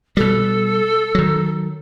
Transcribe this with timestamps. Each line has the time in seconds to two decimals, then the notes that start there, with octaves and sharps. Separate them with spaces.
0.17 B2 G3 A4
1.15 D#3 F#3